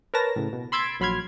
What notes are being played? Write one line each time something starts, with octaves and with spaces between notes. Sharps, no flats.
A#4 B4 C#5 A5 A#6
A2 C#3
B2
B5 C6 E6 G#6 A6 D7
A#1 F#3 B5 C6 F6 G#6